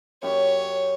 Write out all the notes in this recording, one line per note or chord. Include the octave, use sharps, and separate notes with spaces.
F#2 G4 C#5